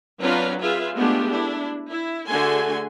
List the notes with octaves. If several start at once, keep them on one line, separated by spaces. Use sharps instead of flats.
F#3 C4 D4 F4 B4 A#5
F4 G#4 B4 E5
G#3 A3 B3 D4 F4 G4
D4 E4
E4
D3 A3 F#4 G#4 G#5 C6